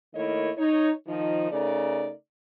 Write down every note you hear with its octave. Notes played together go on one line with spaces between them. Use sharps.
D#3 A3 A#3 E4 C#5 D#5
D#4 C#5
D#3 F3 D#4
C#3 A3 D#4 A#4 D5